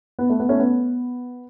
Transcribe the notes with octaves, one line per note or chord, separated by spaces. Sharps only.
B3
A3
B3
A3 C#4
B3